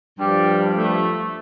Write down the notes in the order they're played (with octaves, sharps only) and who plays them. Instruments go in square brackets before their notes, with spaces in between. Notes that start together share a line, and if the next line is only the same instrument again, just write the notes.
[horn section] G2 F3 G3
A3